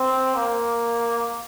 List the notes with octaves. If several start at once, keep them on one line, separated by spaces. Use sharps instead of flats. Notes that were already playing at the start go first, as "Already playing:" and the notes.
Already playing: C4
A#3